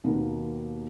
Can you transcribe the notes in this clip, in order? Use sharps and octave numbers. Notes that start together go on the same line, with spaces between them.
D#2 B2 D#3 A#3 B3